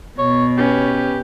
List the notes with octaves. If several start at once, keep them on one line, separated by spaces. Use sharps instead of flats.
B2 C#5
C#4 G4 B4